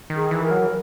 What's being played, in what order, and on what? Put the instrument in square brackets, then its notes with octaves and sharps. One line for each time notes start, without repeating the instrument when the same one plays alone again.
[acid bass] D#3
[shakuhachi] G#4
[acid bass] E3
[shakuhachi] A#4
[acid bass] F#3